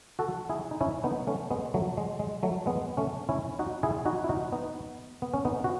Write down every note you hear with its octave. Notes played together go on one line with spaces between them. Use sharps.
F#4 A4
E4 G#4
D#4
C#4 E4
B3 D#4
A3 C#4
G#3 B3
F#3 A3
G#3
G#3
F#3 A3
G#3 B3
A3 C#4
C#4 E4
D#4 F#4
E4 G#4
D#4 F#4
E4
D#4 F#4
B3 D#4
B3
C#4
B3 D#4
F#4